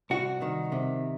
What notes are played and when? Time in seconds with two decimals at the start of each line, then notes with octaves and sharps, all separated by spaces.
0.10 C2 F#4
0.42 D#3
0.72 C3